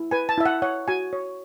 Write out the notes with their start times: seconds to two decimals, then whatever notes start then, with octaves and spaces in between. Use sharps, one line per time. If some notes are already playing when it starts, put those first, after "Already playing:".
Already playing: E4
0.11 B4 G#5
0.29 A5
0.38 E4 E5
0.46 F#5
0.62 C#5 F#5
0.88 F#4 G#5
1.13 C#5